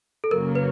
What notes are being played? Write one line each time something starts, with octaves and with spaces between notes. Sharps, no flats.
A4
F#2 C#3 F#3 A#3 A#4
B4